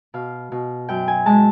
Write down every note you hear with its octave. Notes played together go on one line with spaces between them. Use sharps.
B2 F5
B2
F#2 G5
G#5
G#3 A5